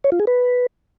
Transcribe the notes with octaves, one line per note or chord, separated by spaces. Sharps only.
C#5
F4
G#4
B4